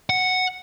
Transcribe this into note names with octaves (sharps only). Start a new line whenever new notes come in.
F#5